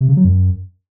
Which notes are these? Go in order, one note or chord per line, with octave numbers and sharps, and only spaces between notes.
C3
C#3
F#3
F#2